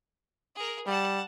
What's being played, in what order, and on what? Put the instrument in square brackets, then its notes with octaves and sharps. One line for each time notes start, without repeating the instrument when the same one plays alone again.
[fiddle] G#4 A#4
[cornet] G3 [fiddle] F#5 A5